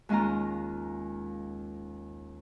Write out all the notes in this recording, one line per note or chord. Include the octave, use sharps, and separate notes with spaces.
D#2 G#3 C#4 F4 A#5